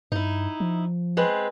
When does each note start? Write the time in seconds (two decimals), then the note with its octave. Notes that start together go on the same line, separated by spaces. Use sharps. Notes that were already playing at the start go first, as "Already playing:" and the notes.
0.12 G2 D#4 E4
0.60 F3
1.17 G#3 C4 B4